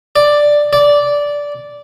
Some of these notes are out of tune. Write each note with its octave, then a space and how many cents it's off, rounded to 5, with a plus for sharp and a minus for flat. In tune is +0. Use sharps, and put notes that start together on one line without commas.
D5 +5
D5 -10